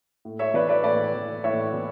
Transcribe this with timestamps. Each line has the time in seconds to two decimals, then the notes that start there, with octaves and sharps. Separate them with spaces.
0.25 A2
0.39 C#5 E5
0.54 E3 B4 D5
0.69 B4 D5
0.84 A2 B4 D5
1.15 E3
1.44 A2 C#5 E5
1.73 E3